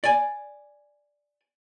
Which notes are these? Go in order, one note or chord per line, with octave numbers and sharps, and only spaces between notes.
D5 G#5